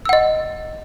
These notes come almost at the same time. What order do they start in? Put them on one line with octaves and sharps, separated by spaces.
E6 F#5 D#5